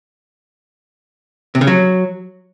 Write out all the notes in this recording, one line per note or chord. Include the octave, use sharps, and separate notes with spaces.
C3
C#3
F#3